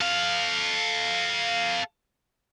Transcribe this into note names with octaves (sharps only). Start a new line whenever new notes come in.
A4 F5